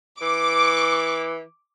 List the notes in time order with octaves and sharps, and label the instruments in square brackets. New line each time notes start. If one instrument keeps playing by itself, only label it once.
[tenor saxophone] E3 [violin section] D6